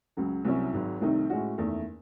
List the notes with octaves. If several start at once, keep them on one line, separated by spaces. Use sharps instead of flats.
C#2 C#3 F#3
C2 C3 F#3 C#4 E4
G#1 G#2 F#3
C2 C3 D#3 A3 D#4
A2 G#3 C#4 F#4
F#1 E2 D#3 A3